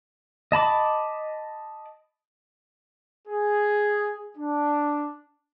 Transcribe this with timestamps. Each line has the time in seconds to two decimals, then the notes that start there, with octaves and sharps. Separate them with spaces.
0.52 D#5 A5 B5 D6
3.28 G#4
4.37 D4